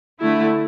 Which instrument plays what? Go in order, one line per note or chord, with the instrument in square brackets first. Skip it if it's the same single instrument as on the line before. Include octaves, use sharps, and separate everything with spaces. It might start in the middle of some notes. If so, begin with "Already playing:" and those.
[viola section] D3 A3 E4